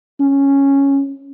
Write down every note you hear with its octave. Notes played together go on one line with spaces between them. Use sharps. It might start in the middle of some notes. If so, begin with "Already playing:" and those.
C#4